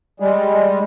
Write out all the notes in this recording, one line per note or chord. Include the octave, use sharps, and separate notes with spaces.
G3 G#3